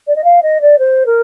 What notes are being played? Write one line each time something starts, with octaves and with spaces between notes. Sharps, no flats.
D5
D#5
F5
D#5
D5
C5
A#4